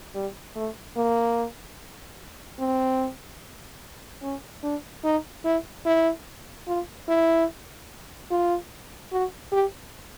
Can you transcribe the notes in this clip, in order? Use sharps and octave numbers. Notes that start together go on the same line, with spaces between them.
G3
A3
A#3
C4
C#4
D4
D#4
E4
E4
F4
E4
F4
F#4
G4